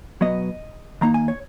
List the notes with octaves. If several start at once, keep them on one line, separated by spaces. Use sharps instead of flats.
B2 F#3 B3 D#5
D#3 A#3 D#4 A#5
G#5
C#5